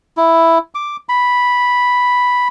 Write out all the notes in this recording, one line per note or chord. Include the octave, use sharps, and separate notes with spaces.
E4
D6
B5